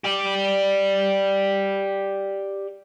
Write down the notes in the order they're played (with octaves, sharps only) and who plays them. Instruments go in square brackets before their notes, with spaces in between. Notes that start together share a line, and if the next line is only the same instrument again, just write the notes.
[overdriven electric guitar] G4 D5